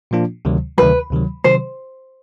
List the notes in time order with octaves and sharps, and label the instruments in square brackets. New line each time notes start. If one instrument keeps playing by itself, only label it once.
[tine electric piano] A#2 F3 A#3 D4 F4
D2 C3 D#3 F#3
[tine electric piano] D2 C3 D#3 F#3 [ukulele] B4
[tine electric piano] D2 C3 D#3 F#3
[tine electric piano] C3 D#3 F#3 [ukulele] C5